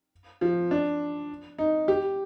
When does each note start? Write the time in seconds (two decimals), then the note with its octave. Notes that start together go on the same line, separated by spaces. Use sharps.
0.41 F3
0.71 D4
1.58 D#4
1.88 G4